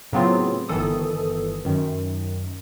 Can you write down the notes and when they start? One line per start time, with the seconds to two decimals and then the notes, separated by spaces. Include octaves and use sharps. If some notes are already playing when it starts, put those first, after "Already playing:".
0.12 A2 C#3 F#3 B3 C4 F4
0.69 G1 D#3 E3 A4 D#6
1.65 F#2 D#3